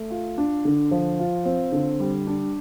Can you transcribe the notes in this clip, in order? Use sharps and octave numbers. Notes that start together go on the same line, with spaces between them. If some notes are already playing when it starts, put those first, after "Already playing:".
Already playing: A3
F4
D4
D3
F3
F4
C4
D3
G3
D4